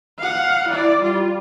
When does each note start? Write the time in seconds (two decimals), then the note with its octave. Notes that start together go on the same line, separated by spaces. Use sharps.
0.19 F5 F#5
0.69 E4 D5
1.02 G3 F4